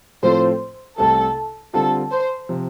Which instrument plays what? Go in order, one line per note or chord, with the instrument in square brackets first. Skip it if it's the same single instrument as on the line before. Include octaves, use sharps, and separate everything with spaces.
[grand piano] A2 F3 C4 F4 A4 [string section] C5
[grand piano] C2 C3 A3 [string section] A4
[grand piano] D3 G3 C4 F4 [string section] A4
[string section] C5
[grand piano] C3 F3